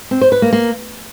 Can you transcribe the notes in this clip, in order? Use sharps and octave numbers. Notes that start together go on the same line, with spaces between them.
C4
C5
B4
A#3
A#3